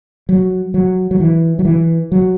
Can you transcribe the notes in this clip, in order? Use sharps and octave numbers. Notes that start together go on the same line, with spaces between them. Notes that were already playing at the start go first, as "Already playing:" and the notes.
F#3
F#3
F#3
E3
F#3
E3
F#3